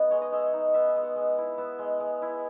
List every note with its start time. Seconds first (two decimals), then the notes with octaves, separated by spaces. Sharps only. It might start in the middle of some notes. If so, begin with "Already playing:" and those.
Already playing: B3 D#4
0.11 G#3 C#5
0.22 D#5
0.32 G#3 E5
0.53 D#4
0.74 B3 E5
0.88 E5
0.96 G#3
1.03 F#5
1.16 G#3
1.38 E4
1.58 B3 E5
1.79 G#3
2.00 G#3
2.22 E4